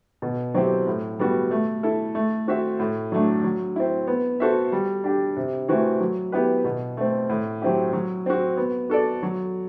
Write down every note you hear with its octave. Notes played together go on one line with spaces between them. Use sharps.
B2
F#3 C4 E4 G4
A2
G3 B3 F#4
A3
E4 A4
A3
C4 F#4 C5 E5
A2
F#3 A3 D4
F#3
C4 E4
B3
F#4 A4 C5 E5
G3
D4 G4
C3
E3 A3 C4 F#4
F#3
B3 E4 G4 B4
B2
A3 C4
A2
F#3 C4 E4 G4
F#3
C4 F#4
B3
F#4 A4 D5
F#3